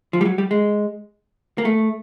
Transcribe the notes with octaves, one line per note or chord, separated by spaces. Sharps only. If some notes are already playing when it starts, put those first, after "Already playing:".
F3
G3
F#3
G3
G#3
A#3
A3